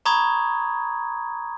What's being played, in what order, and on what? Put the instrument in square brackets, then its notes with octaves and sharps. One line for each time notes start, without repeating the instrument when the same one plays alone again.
[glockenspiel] A#5 B5 C#6 D#6 G#6